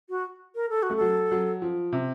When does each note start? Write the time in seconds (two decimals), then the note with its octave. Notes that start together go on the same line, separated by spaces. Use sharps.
0.10 F#4
0.55 A#4
0.70 A4
0.83 F#4
0.90 A3
0.96 F#3 A4
1.31 F#3
1.62 F3
1.92 C3